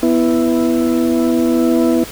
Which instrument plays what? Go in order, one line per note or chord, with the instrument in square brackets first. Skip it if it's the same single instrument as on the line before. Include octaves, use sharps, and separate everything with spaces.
[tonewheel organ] B3 E4